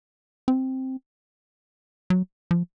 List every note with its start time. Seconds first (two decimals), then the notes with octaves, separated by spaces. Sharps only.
0.48 C4
2.10 F#3
2.51 F3